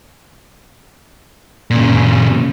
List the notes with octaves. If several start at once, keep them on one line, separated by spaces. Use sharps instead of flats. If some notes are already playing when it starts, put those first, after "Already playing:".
A#2 C#3